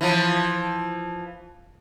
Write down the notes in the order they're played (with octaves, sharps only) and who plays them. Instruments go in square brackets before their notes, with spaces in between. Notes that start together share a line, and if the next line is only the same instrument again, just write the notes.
[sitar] E3 F3